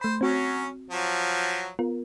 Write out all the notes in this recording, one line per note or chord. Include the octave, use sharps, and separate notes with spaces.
A3 C5 B5
F#3 C4 C#4 F#4
F3 F#3
B3 F4 A#4